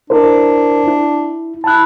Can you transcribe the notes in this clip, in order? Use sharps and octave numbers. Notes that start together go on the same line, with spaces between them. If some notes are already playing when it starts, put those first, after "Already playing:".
D4 E4 A#4 C5
E4
E4 A5 F#6